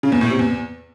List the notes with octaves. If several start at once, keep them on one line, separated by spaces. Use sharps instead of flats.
C#3
E2
A2
C3
E2